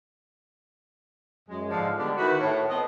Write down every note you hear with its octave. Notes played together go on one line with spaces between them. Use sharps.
F#2 G#3
G#2 D3 F3 G#3 D4 F5
D3 G3 G#3 B3 D4
D#3 E4 F#4 B4
A2
A3 B3 C4 D#5